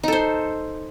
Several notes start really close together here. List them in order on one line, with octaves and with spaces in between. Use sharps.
D#4 A4 C5